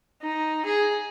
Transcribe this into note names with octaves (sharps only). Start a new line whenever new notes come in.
D#4
G#4